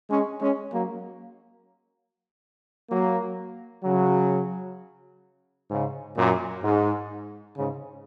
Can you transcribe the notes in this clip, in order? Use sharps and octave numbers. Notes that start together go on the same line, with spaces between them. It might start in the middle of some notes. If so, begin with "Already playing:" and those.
G#3 C#4
G#3 C#4
F#3 A#3
F#3 A#3
C#3 F#3
G#2 C#3
F#2 A#2
G#2
G#2 C#3